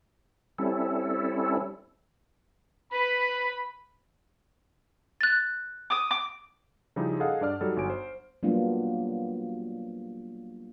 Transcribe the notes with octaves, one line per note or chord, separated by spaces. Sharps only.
G3 C4 C#4 E4 A4
B4 B5
F#6 A6
D6 D#6
D6
C#3 F3 G3 D#4 E4 G4
G#4 A4 D#5 F5 F#5
G2 D4 D5 F6
F#3 G3 D#4 A4
G1 F#3 G#5 D7
C5
F#3 G3 A#3 B3 D4 F4